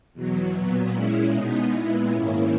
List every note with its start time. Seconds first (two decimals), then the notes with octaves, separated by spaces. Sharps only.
0.14 E2 B2 F#3
0.53 A#2 F#3 B3
0.92 A#2 G#3 C#4 E4
1.32 B2 G#3 B3 D#4
1.71 A#2 G#3 B3 E4
2.11 G#2 D#3 A#3 C#4 E4